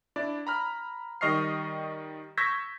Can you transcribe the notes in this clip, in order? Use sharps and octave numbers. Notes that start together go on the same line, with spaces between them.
D4 E4 D5
A#5 B5 F6
D#3 G3 D#5 C#6 F6 C7
C#6 E6 G6 G#6 A#6 B6